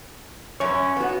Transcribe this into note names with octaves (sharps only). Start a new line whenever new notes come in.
F#2 C#4 C#5
B3 F#4